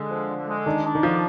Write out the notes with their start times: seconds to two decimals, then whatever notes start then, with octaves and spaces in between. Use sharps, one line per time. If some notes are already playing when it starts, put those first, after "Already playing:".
Already playing: D3 G#3
0.10 F3
0.29 D3
0.47 G#3
0.66 D#3 D4
0.85 D4
0.95 D#3
1.03 D3 F3